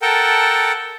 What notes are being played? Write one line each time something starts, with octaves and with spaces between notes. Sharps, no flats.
A4 A#4 F#5 G5 A5